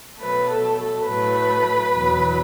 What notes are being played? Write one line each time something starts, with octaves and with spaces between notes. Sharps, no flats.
B2 F#3 A3 B4
A4
A4
A2 F#3 A3 B4
E2 B2 F#3